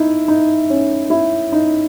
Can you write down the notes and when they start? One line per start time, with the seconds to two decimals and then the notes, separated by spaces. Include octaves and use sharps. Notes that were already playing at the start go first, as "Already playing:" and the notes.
Already playing: D#4 E4
0.28 D#4
0.70 C#4
1.10 E4
1.52 D#4